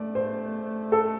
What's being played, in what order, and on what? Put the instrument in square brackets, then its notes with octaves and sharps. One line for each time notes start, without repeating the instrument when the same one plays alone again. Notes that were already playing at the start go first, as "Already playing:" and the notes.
Already playing: [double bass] A3 [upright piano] D5
[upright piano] C5
A4